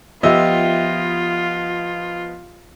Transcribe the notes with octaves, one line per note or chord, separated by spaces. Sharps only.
F3 B3 F4 G4 D#5 E5